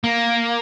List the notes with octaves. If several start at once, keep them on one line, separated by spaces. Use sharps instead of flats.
A#3